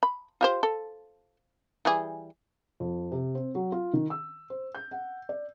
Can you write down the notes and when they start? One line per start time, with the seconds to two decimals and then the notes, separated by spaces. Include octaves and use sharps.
0.03 B5
0.41 F4 G4 C5
0.63 A4
1.85 E3 G3 G#4
2.80 F2
3.12 C3
3.35 C4
3.55 F#3
3.72 F4
3.93 D#3
4.10 E6
4.50 C5
4.75 G6
4.91 F#5
5.29 D5